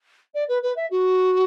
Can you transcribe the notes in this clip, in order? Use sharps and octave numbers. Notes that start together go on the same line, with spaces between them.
D5
B4
B4
E5
F#4